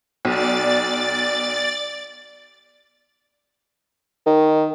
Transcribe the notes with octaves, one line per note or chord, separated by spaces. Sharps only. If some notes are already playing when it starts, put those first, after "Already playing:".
B1 D5 A6
D#3